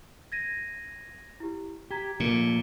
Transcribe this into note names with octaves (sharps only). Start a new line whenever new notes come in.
G#6 A#6 D#7
E4 G4
G4 A#5 G#6 B6
A#2 F3 A3 A#3